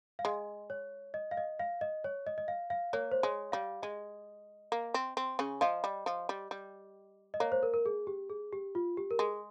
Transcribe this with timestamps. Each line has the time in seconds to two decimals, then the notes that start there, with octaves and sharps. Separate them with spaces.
0.19 F5
0.25 G#3 D#5
0.70 C#5
1.14 D#5
1.31 F5
1.37 D#5
1.60 F5
1.81 D#5
2.04 C#5
2.27 D#5
2.38 D#5
2.48 F5
2.70 F5
2.93 A#3 C#5
3.12 C5
3.23 G#3 C#5
3.52 G3 F5
3.82 G#3 D#5
4.72 A#3
4.94 C4
5.17 C4
5.39 C#3 C#4
5.61 F3 F4 D#5
5.84 G3
6.06 F3
6.29 G3
6.51 G3
7.34 D#5
7.40 A#3 C#5
7.52 C5
7.63 A#4
7.74 A#4
7.86 G#4
8.07 G4
8.30 G#4
8.53 G4
8.75 F4
8.97 G4
9.11 A#4
9.19 G#3 G#4